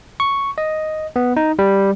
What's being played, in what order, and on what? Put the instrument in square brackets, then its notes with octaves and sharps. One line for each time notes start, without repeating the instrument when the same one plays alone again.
[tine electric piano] C#6
D#5
B3
D#4
G3